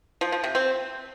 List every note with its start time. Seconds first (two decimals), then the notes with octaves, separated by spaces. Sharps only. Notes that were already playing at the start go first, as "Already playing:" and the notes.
0.21 F3
0.32 F3
0.44 C3
0.55 C4